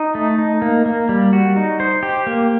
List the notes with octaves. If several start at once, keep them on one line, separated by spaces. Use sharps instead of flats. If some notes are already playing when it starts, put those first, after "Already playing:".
Already playing: D#4
A3
D#4
A#3
A#3
G3
F#4
D#4
C5
G4
A#3